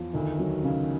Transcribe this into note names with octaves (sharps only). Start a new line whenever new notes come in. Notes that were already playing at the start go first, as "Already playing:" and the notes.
Already playing: E2 F3
D2 D#3
F#3
C#3